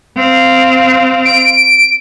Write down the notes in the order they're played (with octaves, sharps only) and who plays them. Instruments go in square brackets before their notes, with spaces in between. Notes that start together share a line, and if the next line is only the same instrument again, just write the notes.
[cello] C4 F5
[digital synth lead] D7